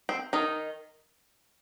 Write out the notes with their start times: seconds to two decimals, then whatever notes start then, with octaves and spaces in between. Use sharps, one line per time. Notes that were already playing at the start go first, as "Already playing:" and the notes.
0.09 C4
0.33 D#3 D#4